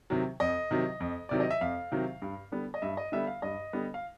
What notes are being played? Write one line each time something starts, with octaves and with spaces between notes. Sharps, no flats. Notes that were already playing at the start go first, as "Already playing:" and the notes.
C3 D#3 F#3
F2 D#5
C3 D#3 F#3
F2
C3 D#3 F#3 D5
D#5
E5
F2 F5
C3 D#3 F#3
G2
D3 G3 B3
D#5
G2 E5
D#5
D3 G3 B3 E5
F5
G2 D#5
D3 G3 B3
F5